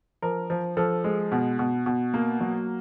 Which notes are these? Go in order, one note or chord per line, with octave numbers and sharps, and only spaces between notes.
F3 A#4
F3
F3 A4
G#3
B2
B2
B2
A#3
F#3